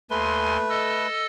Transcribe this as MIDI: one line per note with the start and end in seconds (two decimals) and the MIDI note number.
0.10 0.57 39
0.10 1.07 57
0.10 1.07 71
0.10 0.57 80
0.10 0.57 84
0.69 1.26 69
0.69 1.26 75
0.69 1.26 88